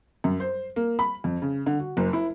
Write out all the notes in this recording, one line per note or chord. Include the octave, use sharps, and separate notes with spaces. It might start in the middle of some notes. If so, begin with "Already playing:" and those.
F#2
C5
A#3
B5
F2
C#3
D3
F#4
F#1
E4